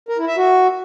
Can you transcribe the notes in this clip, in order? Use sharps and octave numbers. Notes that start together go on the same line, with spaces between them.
A#4
E4
E5
F#4